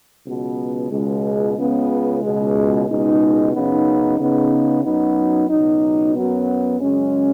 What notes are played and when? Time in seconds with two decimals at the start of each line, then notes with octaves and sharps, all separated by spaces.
0.24 C#2 B2 F#3 B3
0.90 C#2 B2 G#3
1.56 C#2 C#3 B3
2.21 C#2 B2 G#3
2.87 C#2 B2 G#3 D#4
3.52 F#2 C#3 B3 D#4
4.18 C#3 B3 D#4
4.83 F#2 F#3 B3 D#4
5.49 C#2 B2 F#3 D#4
6.14 F#2 F#3 B3
6.80 F#2 C#3 G#3 C#4